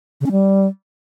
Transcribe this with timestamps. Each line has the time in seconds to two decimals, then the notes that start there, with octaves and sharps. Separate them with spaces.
0.21 C#3
0.26 C#4
0.31 G3